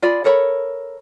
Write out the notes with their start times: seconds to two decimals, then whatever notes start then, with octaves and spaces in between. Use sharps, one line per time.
0.02 F4 G#4 D5 B5
0.24 A4 A#4 C#5 B5